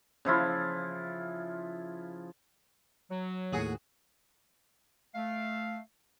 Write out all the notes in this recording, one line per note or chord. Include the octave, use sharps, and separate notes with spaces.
C#3 F3 E4 F4
F#3
D#2 A2 F#4 G#4
A3 F5